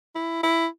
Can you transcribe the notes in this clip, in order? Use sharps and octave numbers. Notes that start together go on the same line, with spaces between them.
E4
E4